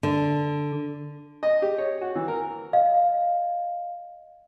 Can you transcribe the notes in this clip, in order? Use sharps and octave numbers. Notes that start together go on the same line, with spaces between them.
D3
D#5
G4
C#5
F#4
E3
A#4
D#5 F5